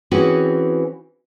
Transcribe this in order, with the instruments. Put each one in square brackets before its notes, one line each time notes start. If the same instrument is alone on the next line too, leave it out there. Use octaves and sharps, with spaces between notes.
[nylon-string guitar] E3 C4 C#4 F#4 G#4